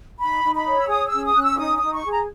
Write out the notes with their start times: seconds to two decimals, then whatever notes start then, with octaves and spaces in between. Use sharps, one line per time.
0.20 D#4 B5
0.43 D#4
0.55 B5
0.66 C#5
0.79 E6
0.89 G#4 D#6
1.07 E6
1.13 C#4
1.25 D#6
1.35 C#4 F#6
1.42 E6
1.59 D#4 D#6
1.77 D#6
1.82 D#4
1.93 C#6
2.05 G#4
2.11 A#5